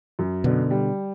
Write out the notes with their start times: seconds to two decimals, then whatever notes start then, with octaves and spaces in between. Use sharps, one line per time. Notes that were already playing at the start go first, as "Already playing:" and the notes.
0.19 F#2
0.44 B2 D3
0.70 G3